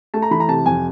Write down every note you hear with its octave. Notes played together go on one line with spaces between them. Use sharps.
A3 A5
A#5
E3 B5
A#5
C3 A5
F2 G#5